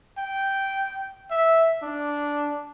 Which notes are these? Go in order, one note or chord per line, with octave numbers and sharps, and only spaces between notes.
G5
E5
D4